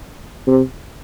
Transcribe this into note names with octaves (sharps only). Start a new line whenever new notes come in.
C3